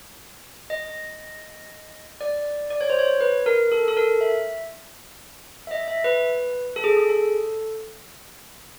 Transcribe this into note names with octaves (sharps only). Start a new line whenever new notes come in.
D#5
D5
D5
C#5
C5
C#5
B4
A#4
A4
A4
A#4
E5
E5
D#5
E5
B4
A4
G#4
G#4
A4